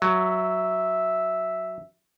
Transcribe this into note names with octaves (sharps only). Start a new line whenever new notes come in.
F#3 E5